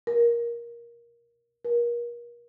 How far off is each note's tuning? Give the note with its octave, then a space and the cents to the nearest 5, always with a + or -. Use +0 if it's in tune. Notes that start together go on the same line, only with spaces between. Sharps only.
A#4 +15
A#4 +35